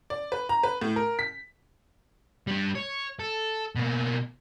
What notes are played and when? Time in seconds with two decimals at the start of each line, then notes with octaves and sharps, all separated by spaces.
0.10 D5
0.32 B4
0.49 A#5
0.63 B4
0.81 A2
0.96 A#4
1.19 B6
2.47 G3 D4
2.75 C#5
3.19 A4
3.76 B2 A#3